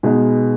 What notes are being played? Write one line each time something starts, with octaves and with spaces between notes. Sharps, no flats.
B2 G#3 B3 D#4